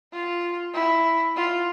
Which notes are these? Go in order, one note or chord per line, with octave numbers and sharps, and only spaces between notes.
F4
E4
F4